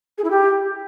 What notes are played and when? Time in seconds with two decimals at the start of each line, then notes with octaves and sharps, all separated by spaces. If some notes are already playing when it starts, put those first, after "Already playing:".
0.18 G#4
0.24 E4
0.31 G4